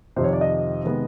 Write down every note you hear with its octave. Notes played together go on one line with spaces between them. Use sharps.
F2 C3 D#3 C5
C#5
D5
D#5
C3 D#3 G#3 B3